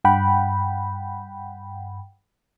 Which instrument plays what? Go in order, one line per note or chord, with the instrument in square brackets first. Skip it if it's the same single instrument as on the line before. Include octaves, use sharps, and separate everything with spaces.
[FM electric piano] G2 F#5 G5 B5